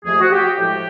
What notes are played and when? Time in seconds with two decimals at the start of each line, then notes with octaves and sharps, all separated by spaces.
0.05 F2 C3 F3 A3 G#4
0.20 F#4
0.31 G4
0.57 A2 F3 G#3 G4